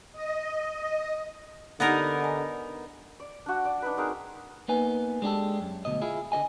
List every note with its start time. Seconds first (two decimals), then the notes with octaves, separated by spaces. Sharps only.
0.12 D#5
1.80 D3 B3 D#4 G4 A#4 D#5 F#5
2.20 D#5 G#5 A#5
3.20 D5
3.46 D4 F#4
3.65 D5
3.82 D4 D#4 B4
3.97 C4 D#4 G#4 A#4
4.68 A#3 B3 D#4 B4 G#5
5.22 G#3 D4 G4 A4
5.60 F#2
5.85 D2 B2 D#5
6.02 E4 F4 G#4
6.32 D3 F#4 D#5 G#5